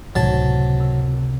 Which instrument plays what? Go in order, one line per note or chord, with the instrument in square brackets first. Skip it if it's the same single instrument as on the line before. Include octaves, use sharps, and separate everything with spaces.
[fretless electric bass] C#2 A2 D#3 [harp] C3 G#6 [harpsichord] F#3 A5
[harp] A#4 E6 F6